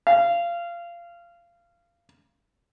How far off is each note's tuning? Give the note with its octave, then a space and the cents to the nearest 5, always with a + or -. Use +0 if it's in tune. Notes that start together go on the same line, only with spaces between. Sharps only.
F5 -20